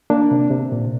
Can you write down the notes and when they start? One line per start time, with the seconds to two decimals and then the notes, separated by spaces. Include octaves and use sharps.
0.10 A#3 D4
0.31 C3
0.51 C3
0.72 A#2